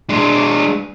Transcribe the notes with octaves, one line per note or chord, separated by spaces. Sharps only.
G#3 D4